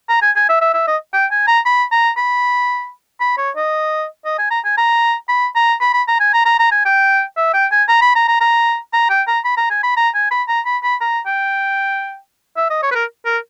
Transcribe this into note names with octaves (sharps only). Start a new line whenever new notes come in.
A#5
G#5
G#5
E5
E5
E5
D#5
G5
G#5
A#5
B5
A#5
B5
B5
C#5
D#5
D#5
G#5
A#5
G#5
A#5
B5
A#5
B5
B5
A#5
G#5
A#5
A#5
A#5
G#5
G5
E5
G5
G#5
A#5
B5
A#5
A#5
A#5
A#5
G5
A#5
B5
A#5
G#5
B5
A#5
G#5
B5
A#5
B5
B5
A#5
G5
E5
D#5
C#5
B4
A#4
A#4